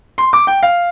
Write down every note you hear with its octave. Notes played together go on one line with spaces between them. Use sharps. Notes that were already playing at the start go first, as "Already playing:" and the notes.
C6
D6
G5
F5